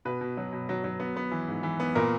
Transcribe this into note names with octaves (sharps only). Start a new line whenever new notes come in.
B2 B4
B2
F#3
B2
F#3
F#3
B3
B3
E3
G#2
E3
B3
A#2 A#4